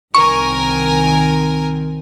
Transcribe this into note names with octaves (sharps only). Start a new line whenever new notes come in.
C2 D#3 C4 A#4 G#5 C#6